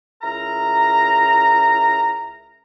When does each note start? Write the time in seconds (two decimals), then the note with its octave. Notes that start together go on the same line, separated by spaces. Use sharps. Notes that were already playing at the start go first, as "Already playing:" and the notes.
0.22 C#2 E4 A#4 A#5